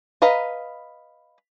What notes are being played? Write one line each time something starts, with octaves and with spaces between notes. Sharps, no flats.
B4 D#5 F5 A#5